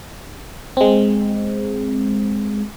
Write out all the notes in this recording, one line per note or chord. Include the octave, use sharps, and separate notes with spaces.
G#3 C4